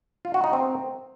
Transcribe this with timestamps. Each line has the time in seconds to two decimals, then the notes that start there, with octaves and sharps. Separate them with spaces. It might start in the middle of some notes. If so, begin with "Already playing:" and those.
0.25 F4
0.34 F#4
0.44 D#4
0.53 C4